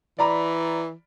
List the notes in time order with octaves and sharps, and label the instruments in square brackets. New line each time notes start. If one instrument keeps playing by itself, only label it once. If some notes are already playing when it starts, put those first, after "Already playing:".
[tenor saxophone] E3 [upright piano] D5 A#5 B5